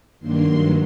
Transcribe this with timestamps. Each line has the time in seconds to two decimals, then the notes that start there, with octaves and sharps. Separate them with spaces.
0.19 G2 D#3 F#3 A#3 D4 C6
0.49 G2 D#3 F#3